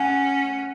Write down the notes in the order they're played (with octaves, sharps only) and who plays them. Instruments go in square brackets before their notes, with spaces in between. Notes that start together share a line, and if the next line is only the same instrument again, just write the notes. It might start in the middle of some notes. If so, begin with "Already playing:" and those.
Already playing: [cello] C#4 [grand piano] F#5 G#5